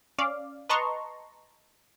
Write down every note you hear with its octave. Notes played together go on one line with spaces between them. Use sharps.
C#4 D5 F5
B4 D#5 A5 A#5 C6 C#6